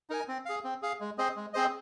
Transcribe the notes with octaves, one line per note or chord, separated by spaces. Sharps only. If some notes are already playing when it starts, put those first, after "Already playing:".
D#4 A#4 G#5
C4
G#4 F5
C4
G#4 F5
G#3
C4 G#4 C5 D#5
G#3
C4 G#4 C5 D#5